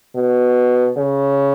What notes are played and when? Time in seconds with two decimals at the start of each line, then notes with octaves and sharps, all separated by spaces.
0.15 B2
0.97 C#3